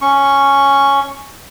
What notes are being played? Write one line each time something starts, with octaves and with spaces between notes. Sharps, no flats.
C#4 C#6